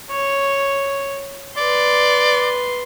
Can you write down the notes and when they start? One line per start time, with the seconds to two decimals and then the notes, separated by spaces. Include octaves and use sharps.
0.10 C#5
1.57 B4 D5 C6